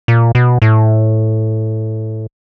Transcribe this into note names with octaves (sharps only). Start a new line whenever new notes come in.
A#2
B2
A2